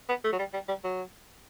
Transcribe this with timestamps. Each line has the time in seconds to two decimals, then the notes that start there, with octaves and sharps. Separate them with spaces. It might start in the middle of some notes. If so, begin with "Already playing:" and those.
0.09 B3
0.24 A3
0.32 F#3
0.39 G3
0.53 G3
0.68 G3
0.84 F#3